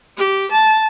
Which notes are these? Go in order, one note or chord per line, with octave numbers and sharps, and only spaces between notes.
G4
A5